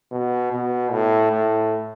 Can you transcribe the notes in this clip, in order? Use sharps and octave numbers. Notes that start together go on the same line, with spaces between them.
B2
B2
A2
A2